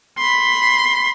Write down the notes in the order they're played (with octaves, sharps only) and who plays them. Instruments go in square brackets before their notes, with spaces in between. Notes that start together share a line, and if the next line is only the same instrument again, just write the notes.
[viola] B5 C6